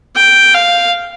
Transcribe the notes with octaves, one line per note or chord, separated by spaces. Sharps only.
G5
F5